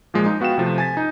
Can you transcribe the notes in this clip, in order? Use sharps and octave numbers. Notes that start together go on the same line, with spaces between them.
A#2 F3 G#3
D#4
B3 F#4 F5 G5 E7
C3 F3 A3
G#5 A6 B6
D#4